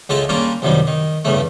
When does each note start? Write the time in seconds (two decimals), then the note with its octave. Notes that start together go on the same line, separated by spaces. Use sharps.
0.09 C#2 G#3 A3 F4 A5
0.29 G3 A#3 C#4 D4 F4
0.62 C2 F#2 D#3 G3
0.87 D#3
1.25 E2 G2 C#3 A3